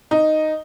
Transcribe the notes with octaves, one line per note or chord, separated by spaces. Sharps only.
D#4